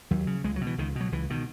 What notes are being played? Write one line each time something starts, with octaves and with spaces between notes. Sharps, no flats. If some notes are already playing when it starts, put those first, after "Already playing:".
D#2 F#3
C#3
C#2 G#3
F#3
B2
E3
C#2 D#3
B2
F#3
C#2 E3
B2 D#3